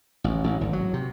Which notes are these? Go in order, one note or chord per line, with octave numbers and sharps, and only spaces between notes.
A1
A1
G#1
F#3
C3